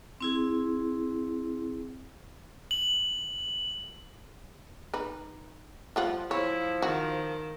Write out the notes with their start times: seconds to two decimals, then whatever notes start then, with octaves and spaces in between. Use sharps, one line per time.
0.21 C4 E4 G#4
2.71 F#7
4.94 D#4 B4
5.96 F3 G3 F4 F#5
6.31 F3 E4 C#5
6.82 D#3 F#4